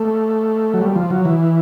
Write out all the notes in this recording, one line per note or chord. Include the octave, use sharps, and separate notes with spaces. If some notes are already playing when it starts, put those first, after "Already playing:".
Already playing: A3
F#3
G3
F3
F#3
E3